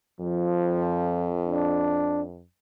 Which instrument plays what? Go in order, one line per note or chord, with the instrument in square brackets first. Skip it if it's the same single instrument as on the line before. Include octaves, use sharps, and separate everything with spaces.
[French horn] F2 [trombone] F3
[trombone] D4